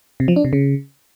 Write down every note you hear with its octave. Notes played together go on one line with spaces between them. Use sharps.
C3
F3
D4
C3
C#3